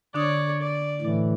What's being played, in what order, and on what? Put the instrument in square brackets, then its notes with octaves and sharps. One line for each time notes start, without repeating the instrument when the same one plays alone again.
[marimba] D3 D4 D#6 [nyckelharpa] C#5 D5
[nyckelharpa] D5
[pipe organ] A2 E3